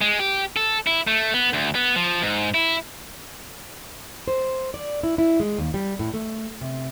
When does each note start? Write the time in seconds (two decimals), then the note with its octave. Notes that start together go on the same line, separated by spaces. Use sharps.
0.01 G#3
0.19 G4
0.57 A4
0.87 E4
1.07 A3
1.34 B3
1.53 D2
1.75 B3
1.96 F3
2.22 G#2
2.54 E4
4.28 C5
4.74 D5
5.03 E4
5.18 E4
5.40 G#3
5.58 D#2
5.74 G3
5.99 A2
6.14 A3
6.61 C3